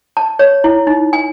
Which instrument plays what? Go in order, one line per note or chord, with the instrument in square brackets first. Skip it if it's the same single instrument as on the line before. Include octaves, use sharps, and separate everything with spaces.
[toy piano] A5
C#5
E4
D#4
G#5